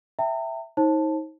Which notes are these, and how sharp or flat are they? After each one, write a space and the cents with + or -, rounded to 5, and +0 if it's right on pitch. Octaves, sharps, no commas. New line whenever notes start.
E5 +0 G5 +0 A#5 -40
D#4 +35 C5 +40 A5 +0